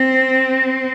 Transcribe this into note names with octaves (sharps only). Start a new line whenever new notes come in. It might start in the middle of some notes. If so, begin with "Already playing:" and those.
Already playing: C4